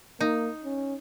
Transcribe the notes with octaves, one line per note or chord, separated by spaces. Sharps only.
A#3 D#4
C#4